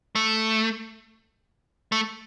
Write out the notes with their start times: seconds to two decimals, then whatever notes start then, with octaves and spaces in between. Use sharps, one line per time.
0.15 A3
1.92 A3